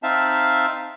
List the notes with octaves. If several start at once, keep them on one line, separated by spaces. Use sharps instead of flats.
C4 D#4 E5 F5 A5